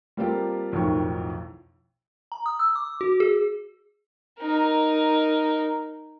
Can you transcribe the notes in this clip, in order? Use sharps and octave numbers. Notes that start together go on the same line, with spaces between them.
G3 A#3 C4 F4 G4 A4
B1 F2 A2 D#3 A#4 C#6
A#5
D#6
E6
D6
F#4
G#4
D#4 A#4